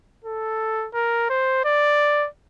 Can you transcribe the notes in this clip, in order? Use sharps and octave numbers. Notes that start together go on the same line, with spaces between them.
A4
A#4
C5
D5